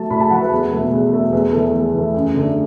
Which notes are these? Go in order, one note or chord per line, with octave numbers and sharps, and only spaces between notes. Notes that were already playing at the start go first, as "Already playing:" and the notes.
Already playing: F#3 A3 A5
A2 B5
A5
F#3 A3 F#5
B4
E2
B2 F#3 A3
E2
B2 F#3 A3
E2 B4
E3 A3 A4
E2
E3 A3
F#2
D3 A3